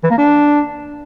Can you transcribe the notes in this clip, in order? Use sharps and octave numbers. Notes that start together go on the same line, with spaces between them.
E3
A#3
D4